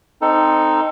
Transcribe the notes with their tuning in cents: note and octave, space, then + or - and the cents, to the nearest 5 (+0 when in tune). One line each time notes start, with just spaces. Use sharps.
C4 +0 D#4 +0 A4 +20